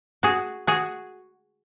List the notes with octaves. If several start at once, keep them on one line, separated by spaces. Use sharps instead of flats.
F#4 G#4
F#4 G#4